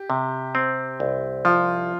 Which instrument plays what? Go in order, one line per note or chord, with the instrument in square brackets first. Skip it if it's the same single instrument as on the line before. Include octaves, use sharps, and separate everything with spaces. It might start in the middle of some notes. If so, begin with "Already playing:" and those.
Already playing: [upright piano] G4
[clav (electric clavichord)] C3
C4
C2
[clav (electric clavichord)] F3 [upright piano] F4